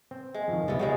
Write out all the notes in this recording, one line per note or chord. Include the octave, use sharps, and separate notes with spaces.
C4
G#3
F2 D#3
C2 G3 G#3 B3 E5
C#3 G3 G#3 F#4 C#5 G5